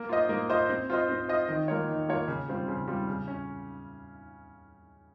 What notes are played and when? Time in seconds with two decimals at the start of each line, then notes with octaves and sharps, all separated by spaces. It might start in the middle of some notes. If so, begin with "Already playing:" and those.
Already playing: A#3
0.09 F4 C5 D#5
0.29 A#3
0.49 F4 C5 D#5
0.69 C4
0.90 F4 C5 D#5
1.09 C4
1.29 F4 C5 D#5
1.48 D#3
1.68 A#3 F4 A#4 C#5
1.88 D#3
2.09 A#3 F4 A#4 C#5
2.28 C#3
2.48 G3 C4 F4
2.68 C#3
2.88 G3 C4 F4
3.08 C#3
3.28 C#4